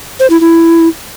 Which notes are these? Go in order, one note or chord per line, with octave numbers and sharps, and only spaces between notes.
C5
E4
E4